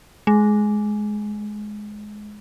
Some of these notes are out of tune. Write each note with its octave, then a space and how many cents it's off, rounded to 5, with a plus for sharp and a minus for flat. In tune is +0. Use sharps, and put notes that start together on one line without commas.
G#3 +15